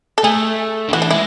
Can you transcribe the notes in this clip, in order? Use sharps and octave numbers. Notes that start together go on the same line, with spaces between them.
A4
A3 G#4
D3
E3 F#4
D4
G#3 E4